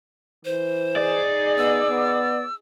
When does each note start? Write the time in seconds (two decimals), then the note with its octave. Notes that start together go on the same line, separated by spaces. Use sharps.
0.45 E3 C5
0.96 D#4 G#4 D5
1.58 B3 E6
1.88 B3